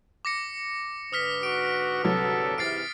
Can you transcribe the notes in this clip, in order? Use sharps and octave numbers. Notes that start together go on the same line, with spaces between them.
D6 A#6 C#7
G#2 D3 B4 D#6 F6 B6
F#4 D7
C2 F#3 A4
G#2 C3 E3 F6 A6 C7 D7